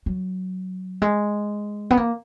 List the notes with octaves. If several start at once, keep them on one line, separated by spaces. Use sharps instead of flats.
F#3
G#3
B3
A#3